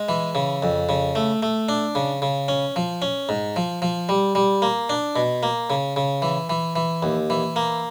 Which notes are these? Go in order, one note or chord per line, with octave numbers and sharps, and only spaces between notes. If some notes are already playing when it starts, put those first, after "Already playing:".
Already playing: G#3
E3
C#3
F2
C#3
A3
A3
D4
C#3
C#3
C#4
F3
C#4
G#2
F3
F3
G3
G3
A#3
D4
B2
A#3
C#3
C#3
E3
E3
E3
D#2
E3
A#3